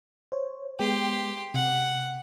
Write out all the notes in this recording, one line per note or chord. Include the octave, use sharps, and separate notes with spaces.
C5 C#5
G#3 B3 G4 G5 C6
C3 F#5